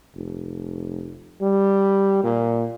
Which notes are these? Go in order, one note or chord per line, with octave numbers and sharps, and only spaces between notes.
F1
G3
A#2